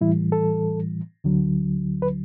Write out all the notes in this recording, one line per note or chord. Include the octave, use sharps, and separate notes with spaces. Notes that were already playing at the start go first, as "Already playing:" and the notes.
A2 E3 G3 E4
A4
D2 D3 F#3
B4